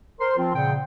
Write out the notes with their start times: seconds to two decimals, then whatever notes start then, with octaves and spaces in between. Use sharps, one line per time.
0.21 A#4 C5 C6
0.37 F3 C4 F4
0.55 A#2 C#3 F#5 G5